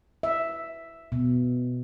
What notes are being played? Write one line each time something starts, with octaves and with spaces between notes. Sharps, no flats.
E5
B2